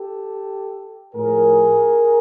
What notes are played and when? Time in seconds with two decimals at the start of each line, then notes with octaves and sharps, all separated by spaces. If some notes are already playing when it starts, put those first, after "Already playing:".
Already playing: G4 A4
1.14 A2 F3 G#4 A#4